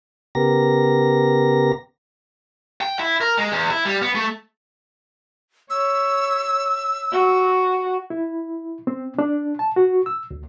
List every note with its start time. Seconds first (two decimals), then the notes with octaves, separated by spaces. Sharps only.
0.35 C#3 B3 G4 A#4 A#6
2.81 G5
2.99 E4
3.21 A#4
3.37 G#3
3.52 E2
3.70 E4
3.85 G3
4.02 B3
4.15 A3
5.70 C#5 E6
7.12 F#4
8.10 E4
8.87 C4
9.19 D4
9.59 A5
9.76 F#4
10.06 E6
10.31 D2